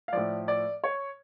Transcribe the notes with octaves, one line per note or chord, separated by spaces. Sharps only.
F5
A2 F3 D5
D5
C#5